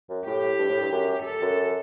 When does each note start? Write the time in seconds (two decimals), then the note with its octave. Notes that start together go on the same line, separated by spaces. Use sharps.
0.09 F#2
0.26 A2 G4
0.59 G2
0.70 A2
0.81 G2
0.92 F#2
1.25 A4
1.42 F#2